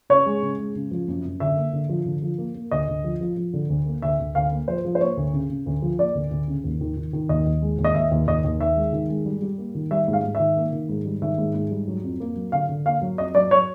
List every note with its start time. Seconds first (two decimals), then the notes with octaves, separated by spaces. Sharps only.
0.10 C#3 C#5
0.26 G#3
0.42 C#3
0.59 G#3
0.75 C#3
0.91 F3
1.08 F#2
1.25 F#2
1.40 D3 E5
1.57 A#3
1.73 D3
1.89 F3
2.06 D3
2.22 F3
2.38 A#3
2.55 A#3
2.71 D2 D#5
2.88 D2
3.04 F3
3.21 F3
3.37 F3
3.53 D3
3.69 D2
3.86 A#3
4.02 D2 E5
4.19 D2
4.35 D2 F5
4.52 A#3
4.68 F3 C5
4.85 F3
4.95 C5
5.01 A#3 C#5
5.17 D2
5.33 C#3
5.50 C#3
5.66 D2
5.82 F3
5.99 A#3 D5
6.15 D2
6.31 D2
6.48 C#3
6.64 D#2
6.81 D#3
6.97 D#3
7.13 D#3
7.29 D#2 D#5
7.46 D#2
7.62 G#3
7.78 D#2
7.84 D#5
7.95 D#2 E5
8.11 D#2
8.27 D#2 D#5
8.44 D#2
8.60 D#3 E5
8.76 G#3
8.93 D#3
9.09 G#3
9.25 G3
9.42 G3
9.58 A#3
9.75 D#3
9.91 G3 E5
10.08 G#2
10.13 F5
10.24 G#2
10.35 D#3 E5
10.57 A#3
10.73 D#3
10.89 G#2
11.06 G3
11.22 D#3 E5
11.38 G#2
11.55 G#2
11.71 G3
11.88 F#3
12.04 F2
12.20 A#3
12.36 F#3
12.52 D3 F5
12.69 D3
12.86 A#3 F5
13.02 F#3
13.18 F2 D#5
13.35 F#3 D5
13.51 F#3 C#5